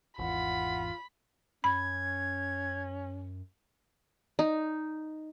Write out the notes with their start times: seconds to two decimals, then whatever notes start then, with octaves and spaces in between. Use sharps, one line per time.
0.19 G#1 E2 F4 F#5 B5
1.64 F#2 C#4 B5 G#6
4.39 D#4